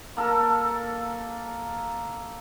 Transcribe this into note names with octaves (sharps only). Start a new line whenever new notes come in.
A#3 A4 A#4